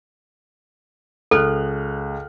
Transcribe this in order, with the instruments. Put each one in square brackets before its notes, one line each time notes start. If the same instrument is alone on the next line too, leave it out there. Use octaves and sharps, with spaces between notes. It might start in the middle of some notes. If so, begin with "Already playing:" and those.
[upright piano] C#2 F6 F#6 [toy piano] A4